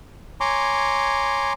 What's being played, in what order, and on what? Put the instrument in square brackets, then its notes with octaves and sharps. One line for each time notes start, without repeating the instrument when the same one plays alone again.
[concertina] C#5 G#5 A#5 C6 D6